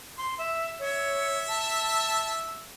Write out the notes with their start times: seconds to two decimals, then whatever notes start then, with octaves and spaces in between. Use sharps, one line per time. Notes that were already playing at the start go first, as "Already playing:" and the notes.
0.18 C6
0.39 E5
0.79 C#5 E5
1.48 A5